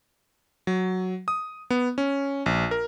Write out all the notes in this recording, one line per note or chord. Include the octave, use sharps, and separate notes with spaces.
F#3
D#6
B3
C#4
A#1
A#4